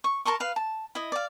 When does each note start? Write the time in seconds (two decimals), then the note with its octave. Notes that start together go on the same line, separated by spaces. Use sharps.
0.04 C#6
0.25 A#4 A5 C6 C#6
0.40 B4 F5
0.56 A5
0.95 E4 D#5
1.12 D5 F5